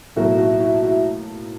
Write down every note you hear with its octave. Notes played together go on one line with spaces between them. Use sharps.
B1 A2 F#3 A#3 E4 F#4
E4 F#4
E4 F#4
E4 F#4